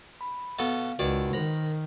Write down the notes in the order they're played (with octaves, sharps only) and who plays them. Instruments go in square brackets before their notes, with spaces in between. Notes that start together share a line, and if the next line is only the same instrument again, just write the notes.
[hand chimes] B5
[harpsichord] B2 B3 A4 [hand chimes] F5
[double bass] C#2 [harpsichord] D#3 D5 [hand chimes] F#4 B4 F#5
[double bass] D#3 [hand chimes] C5 A#6 [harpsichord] A#5 B5